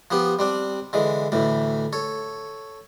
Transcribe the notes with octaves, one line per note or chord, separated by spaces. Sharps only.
F3 B3 G4
G3 C4 D4
D3 E3 G#3
D2 A2 E3
A4 C#5